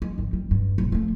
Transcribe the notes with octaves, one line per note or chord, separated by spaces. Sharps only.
G#3
G#1 D3
G3
G2
D#1
F3 A3